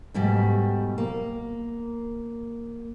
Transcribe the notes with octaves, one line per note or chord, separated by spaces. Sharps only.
G#2 B2 G3 A3
A#3